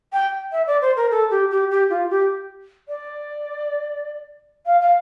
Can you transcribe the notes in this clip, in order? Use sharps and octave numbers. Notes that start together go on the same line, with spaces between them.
G5
E5
D5
C5
A#4
A4
G4
G4
G4
F4
G4
D5
F5
F5